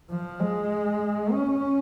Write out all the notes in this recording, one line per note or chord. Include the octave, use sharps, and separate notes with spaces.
F3
G#3
C#4